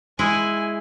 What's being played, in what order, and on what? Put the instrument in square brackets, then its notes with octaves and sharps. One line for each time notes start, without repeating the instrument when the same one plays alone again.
[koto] G#3 E4 [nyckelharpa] G#5